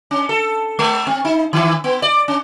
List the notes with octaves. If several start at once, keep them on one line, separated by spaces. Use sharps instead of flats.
C#4
A4
G#3
C4
D#4
D#3
B3
D5
C#4